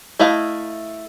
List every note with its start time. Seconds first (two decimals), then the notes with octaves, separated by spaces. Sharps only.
0.19 A3 E4 D#5 F5 A5